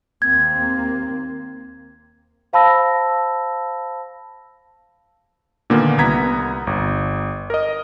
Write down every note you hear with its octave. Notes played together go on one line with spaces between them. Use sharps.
D#2 A#3 C4 G#6
C5 F5 A5 B5 E6 A#6
A#2 D3 D#3 A#3 B3
C2 B3 A#5 G#6 B6
G1
A#4 D#5